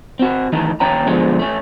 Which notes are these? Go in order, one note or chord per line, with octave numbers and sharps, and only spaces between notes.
C4 F#4
D#3 E3 A3 D#4
D#2 C#4 C#5 G5 A#5
G#2 B2 D3 F3 G#3
A3 C#4